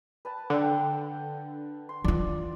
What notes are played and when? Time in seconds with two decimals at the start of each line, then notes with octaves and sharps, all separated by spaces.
0.25 B4 A5 B5
0.50 D3 F#5 G5
1.89 C6
2.04 E3 F4 D5